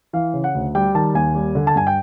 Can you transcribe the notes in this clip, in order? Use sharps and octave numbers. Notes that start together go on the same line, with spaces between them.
E3 F5
C#3
F#5
D2
G3 G5
D#3 A5
D#2 G#5
G3
D3
A5
G2 G#5
G5